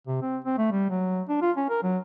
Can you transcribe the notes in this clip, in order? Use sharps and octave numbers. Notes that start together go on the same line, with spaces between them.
C3
C4
C4
A3
G3
F#3
D4
F4
C#4
A#4
F#3